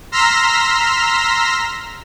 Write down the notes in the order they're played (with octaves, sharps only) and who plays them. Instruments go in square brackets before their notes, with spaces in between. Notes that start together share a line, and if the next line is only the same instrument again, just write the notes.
[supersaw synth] A#5 C6 E6 F6 A#6 B6